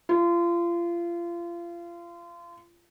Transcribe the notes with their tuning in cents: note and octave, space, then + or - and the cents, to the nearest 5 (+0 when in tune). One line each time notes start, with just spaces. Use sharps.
F4 -30